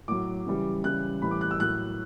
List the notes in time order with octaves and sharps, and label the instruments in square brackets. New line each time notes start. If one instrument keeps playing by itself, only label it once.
[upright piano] A2 F#3 D6
C#3 E3 G3
C#3 E3 G3 F#6
A2 E3 G3 B5
D6
F#6
E6
A2 F#3 F#6